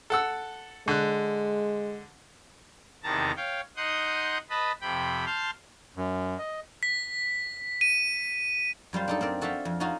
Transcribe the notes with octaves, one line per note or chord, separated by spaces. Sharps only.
A4 F#5 E6
D3 G#3 F#6
E2 C3 D#3 A5 A#5
C#5 F5 G5
D#4 F#5 C6 D#6 G6
B4 D#5 A5 B5
F2 C3 G5 B5
A5 C6 F6 G6
F#2
D#5
B6
D#7
F#2 G3 F4 C5
D4 D#4 A4
C4 A#4 D5
F#4 A4 D5 E5 F5 G5
F2
C#4 D#4 F4 F#4